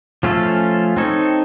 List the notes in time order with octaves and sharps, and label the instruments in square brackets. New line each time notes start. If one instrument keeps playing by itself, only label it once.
[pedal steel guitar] F3 A3 C#4 F4 A4
C4 D#4 A4 C#5